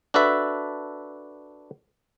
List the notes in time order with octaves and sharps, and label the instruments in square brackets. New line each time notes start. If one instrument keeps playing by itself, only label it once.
[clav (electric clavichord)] D4 F#4 A4 B4 E5